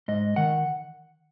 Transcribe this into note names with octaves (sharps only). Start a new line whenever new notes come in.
G#2 D#5
D#3 F#5